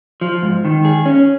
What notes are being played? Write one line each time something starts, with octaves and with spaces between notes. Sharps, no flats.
F3
G#2
D#3
G#4
C#4